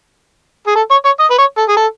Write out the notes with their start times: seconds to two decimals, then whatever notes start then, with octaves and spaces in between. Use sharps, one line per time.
0.67 G#4
0.76 A4
0.91 C#5
1.05 C#5
1.19 D#5
1.31 B4
1.38 C#5
1.58 A4
1.68 G#4
1.77 A4